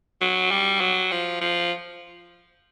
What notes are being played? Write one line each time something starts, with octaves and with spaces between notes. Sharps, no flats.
F#3
G3
F#3
F3
F3